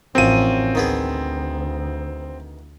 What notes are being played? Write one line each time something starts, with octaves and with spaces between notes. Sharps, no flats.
A1 F#2 F3 C4 C#4 D#7
D2 D#3 B3 G#4